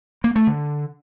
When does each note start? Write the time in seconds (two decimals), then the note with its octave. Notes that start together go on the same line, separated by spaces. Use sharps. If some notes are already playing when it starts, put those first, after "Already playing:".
0.24 A#3
0.36 A3
0.47 D3